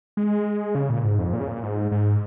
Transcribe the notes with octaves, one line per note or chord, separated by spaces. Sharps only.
G#3
C#3
A#2
G#2
F2
A#2
C#3
A#2
G#2
G#2